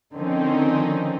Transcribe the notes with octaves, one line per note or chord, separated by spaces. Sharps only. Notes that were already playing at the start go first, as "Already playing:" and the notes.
D3 D#3 F3 C4 C#4 D#4